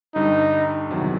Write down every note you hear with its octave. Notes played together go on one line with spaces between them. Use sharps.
G2 D3 G3 D#4
E2 C3 D#3 F#3